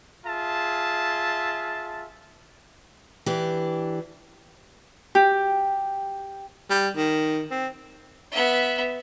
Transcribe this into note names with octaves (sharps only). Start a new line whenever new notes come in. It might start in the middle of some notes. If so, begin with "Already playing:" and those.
F4 G#4 E5 A5
E3 D4 G4
G4
G3
D#3
C4
B3 E5